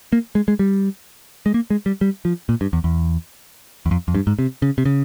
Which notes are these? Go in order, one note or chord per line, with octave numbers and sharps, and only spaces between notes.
A#3
G#3
G#3
G3
G#3
A#3
G#3
G3
G3
F3
A#2
G2
E2
E2
E2
F2
F2
G2
G#2
C3
C#3
C3
C#3